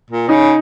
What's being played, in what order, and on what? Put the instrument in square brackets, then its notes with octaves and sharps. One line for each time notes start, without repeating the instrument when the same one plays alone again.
[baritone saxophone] A#2
[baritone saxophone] C#3 [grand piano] D#4